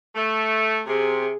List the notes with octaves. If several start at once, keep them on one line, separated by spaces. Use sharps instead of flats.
A3
C3 G#4